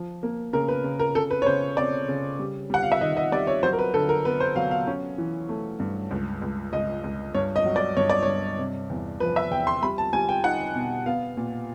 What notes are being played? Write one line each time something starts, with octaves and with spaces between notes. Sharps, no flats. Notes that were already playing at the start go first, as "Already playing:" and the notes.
Already playing: F3
A#3
C#3 A#4
B4
C#3
A#4
C#3 A4
B4
C#5
C#3 C5
C4 D5
C#3
G3
G3 F#5
F5
E5
D#3 D#5
D#5
G3 D5
C#5
F#3 C5
A#4
B4
D3 A4
A#4
B3 B4
C5
F#3 F5
F5
C#4
E3
A3
G2
C#2
C#2
C#2 D#5
C#2
G2 C#5
D#5
F#3
D5
G2 C#5
D5
G2 C#5
C3
E2
F3 B4
E5
E2 G5
C6
G3 B5
A5
G3 G#5
G5
D#4 F#5
B2
B3 F5
A#2